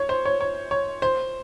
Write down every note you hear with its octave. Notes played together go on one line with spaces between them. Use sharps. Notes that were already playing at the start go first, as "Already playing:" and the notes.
Already playing: C#5
C5
C#5
C#5
C#5
C5